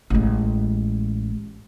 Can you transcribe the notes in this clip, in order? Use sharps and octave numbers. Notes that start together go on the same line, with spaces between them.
A1 G#3